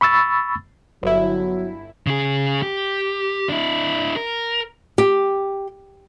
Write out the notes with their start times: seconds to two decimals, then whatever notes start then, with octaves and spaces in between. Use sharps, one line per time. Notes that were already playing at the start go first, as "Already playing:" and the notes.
0.01 B5 C#6 E6 A6
1.03 G1 F#3 E4
2.07 C#3 G#4
2.63 G4
3.49 D4 E4
4.16 A#4
4.98 G4